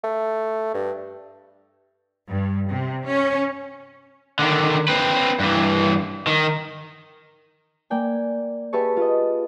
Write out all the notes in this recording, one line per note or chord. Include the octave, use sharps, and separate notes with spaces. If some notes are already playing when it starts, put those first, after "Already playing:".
A3
G2
G2
C3
C#4
D3 D#3
C4 B4
G2 E3
D#3
A#3 D5 G5 G#5
G4 G#4 B4 E5 A5 C#6
F4 D#5